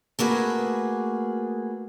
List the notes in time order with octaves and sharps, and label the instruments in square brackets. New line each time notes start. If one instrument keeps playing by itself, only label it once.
[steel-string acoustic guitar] A3 A#3 F#4 G#4 B4